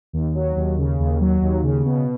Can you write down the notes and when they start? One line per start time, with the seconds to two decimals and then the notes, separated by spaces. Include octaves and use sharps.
0.13 D#2
0.35 F#3
0.56 D#2
0.78 C#3
0.99 D#2
1.21 F#3
1.42 D#2
1.63 C#3
1.85 B2